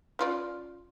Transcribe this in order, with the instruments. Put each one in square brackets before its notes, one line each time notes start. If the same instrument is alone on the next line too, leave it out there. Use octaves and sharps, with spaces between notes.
[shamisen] C#4 F4 D5